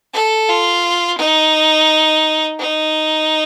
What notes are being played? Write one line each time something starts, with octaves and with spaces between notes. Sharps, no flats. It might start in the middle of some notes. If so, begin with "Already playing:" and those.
A4
F4
D#4
D#4